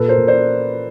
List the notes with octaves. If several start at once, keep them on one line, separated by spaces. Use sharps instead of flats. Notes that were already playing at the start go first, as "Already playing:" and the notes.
Already playing: A#2 A4 B4
A#4 C5
A#2
C5 D5